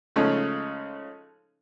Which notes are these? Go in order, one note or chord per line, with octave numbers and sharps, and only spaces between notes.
C#3 F3 G#3 A3 C#4 D#4